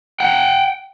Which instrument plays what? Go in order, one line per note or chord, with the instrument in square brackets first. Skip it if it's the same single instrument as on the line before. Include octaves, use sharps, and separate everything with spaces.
[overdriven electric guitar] F#5 G5